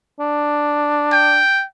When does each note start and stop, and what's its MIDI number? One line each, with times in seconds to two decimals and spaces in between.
0.20 1.40 62
1.12 1.64 79